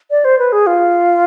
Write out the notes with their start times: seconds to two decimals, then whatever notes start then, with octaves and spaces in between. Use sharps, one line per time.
0.11 D5
0.25 C5
0.39 B4
0.52 G#4
0.67 F4